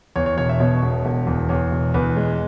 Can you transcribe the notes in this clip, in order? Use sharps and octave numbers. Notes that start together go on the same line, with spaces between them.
E2 C#5
C#5
E1 C#5
E5
B2 C#5
E1
E1
E2
E2 C#5
E1
E2 B4
G#3